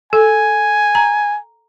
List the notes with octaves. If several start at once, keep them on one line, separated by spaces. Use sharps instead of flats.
A4 G#5
A#5